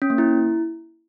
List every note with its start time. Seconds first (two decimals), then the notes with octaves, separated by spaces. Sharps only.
0.02 C#4
0.10 A#3
0.18 E4